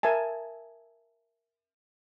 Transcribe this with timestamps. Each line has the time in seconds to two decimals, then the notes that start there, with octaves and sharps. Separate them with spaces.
0.03 A#4 E5 G#5 A5